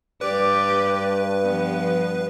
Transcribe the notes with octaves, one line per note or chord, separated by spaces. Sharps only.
G2 G4 B4 D5
F3 B3